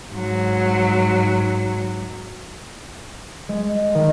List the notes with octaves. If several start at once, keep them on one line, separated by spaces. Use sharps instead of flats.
G#2 F#3
G#3
D#3